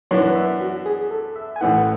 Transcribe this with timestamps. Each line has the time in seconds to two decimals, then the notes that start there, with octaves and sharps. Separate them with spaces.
0.11 F#2 E3 B3 D4 C#5
0.36 E5
0.61 F#4
0.86 G#4
1.11 A4
1.36 E5
1.56 G#5
1.61 A1 A2 E3 F#5